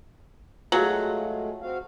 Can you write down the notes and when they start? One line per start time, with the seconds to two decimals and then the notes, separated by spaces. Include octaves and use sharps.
0.72 F#3 G#3 A3 F4 F#4 G#4
1.62 C4 F#4 F5